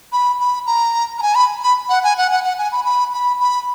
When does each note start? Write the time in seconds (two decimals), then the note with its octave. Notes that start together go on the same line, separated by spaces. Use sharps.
0.13 B5
0.40 B5
0.67 A#5
1.18 A#5
1.22 G#5
1.35 B5
1.63 B5
1.89 F#5
2.04 G#5
2.18 F#5
2.31 F#5
2.44 F#5
2.59 G#5
2.72 B5
2.85 B5
3.13 B5
3.40 B5